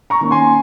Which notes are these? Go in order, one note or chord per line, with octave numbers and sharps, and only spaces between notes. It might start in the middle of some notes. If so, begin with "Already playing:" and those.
A#5 C#6
D#3 A#3 C#4
G#5 C6